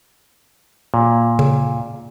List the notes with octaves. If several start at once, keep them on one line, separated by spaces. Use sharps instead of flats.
A#2
C#3